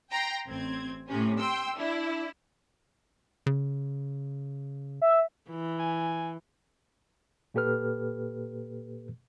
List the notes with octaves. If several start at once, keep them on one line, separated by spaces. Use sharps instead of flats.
G5 A#5 C6
A1 C4 G#6
A2 C3 C#4
G5 C6 E6
D4 E4
C#3
E5
E3
G#5
A#2 A#3 G4 A4 B4 F6